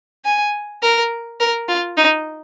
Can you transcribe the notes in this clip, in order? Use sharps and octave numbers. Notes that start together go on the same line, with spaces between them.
G#5
A#4
A#4
F4
D#4